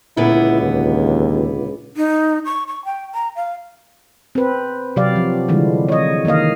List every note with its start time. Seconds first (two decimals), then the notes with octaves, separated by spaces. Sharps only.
0.17 C#2 A#2 D3 B3 E4
0.62 D#2
1.97 D#4
2.45 C#6
2.68 C#6
2.85 G5
3.14 A#5
3.36 F5
4.35 C4 B4
4.96 C3 F#3 G4 D5 F5
5.16 F3
5.48 D3 E3 F3 G3 G#3
5.89 C#5 D#5
6.25 D#3 E3 A#3 D#5 F5